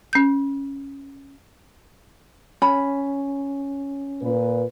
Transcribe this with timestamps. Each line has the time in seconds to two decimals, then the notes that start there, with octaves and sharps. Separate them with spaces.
0.13 C#4 G6
2.62 C#4 B5
4.22 A#2 B4